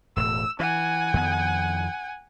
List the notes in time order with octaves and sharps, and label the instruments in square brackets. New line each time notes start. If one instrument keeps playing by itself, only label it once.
[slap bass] E1 A2 [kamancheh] E6
[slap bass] E3 [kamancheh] F#5 G#5
[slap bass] F2 D#3 B3